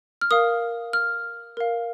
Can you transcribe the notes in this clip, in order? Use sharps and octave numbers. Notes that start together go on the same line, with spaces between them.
F6
A#4 F5 D#6
F6
A#4 F5